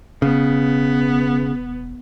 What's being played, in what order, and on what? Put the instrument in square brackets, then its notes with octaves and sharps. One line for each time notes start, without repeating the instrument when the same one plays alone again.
[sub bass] E1 [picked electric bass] C#3 [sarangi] B3